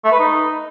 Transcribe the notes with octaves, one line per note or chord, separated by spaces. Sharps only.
A3
B4
D#4